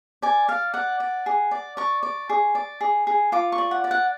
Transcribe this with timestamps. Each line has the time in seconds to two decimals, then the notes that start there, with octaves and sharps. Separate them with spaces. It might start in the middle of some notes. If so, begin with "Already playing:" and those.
0.22 D5 G#5
0.48 D5 F5
0.74 D5 F#5
1.00 D5
1.26 G#4
1.51 D5
1.77 D5 C#6
2.03 D5
2.29 G#4
2.55 D5
2.81 G#4
3.07 G#4
3.32 F4 D6
3.52 C#6
3.58 D5
3.71 F#5
3.84 D5
3.91 F#5